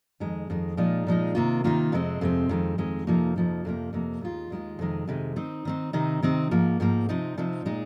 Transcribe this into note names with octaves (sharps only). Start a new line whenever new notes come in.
F2 D#3 G#3
F2 D#3 G#3
A#2 F3 G#3 D#4
A#2 F3 G#3 D#4
C3 D#3 A#3 F4
C3 D#3 A#3 F4
F2 C3 G#3 C4
F2 C3 G#3 C4
F2 D#3 G#3 C4
F2 D#3 G#3 C4
F2 C3 F3 A#3 D#4
F2 C3 F3 A#3 D#4
F2 C3 F3 A#3
F2 C3 F3 A#3
D#2 D#3 G#3 F4
D#2 D#3 G#3 F4
F2 C3 D#3 G#3
F2 C3 D#3 G#3
D#3 C4 D#4
D#3 C4 D#4
C3 D#3 C4 D#4
C3 D#3 C4 D#4
G#2 F3 A#3
G#2 F3 A#3
C3 F3 C4 D#4
C3 F3 C4 D#4
A#2 G#3 D#4